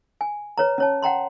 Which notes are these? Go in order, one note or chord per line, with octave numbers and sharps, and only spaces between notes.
G#5
B4 C#5 A#5
C#4 C#5 A5
F#5 G5 A#5 C6